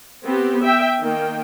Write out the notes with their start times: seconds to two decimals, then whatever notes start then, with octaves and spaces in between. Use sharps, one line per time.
0.24 B3 C4 G4
0.61 E5 G5
1.00 D#3 A#3 G5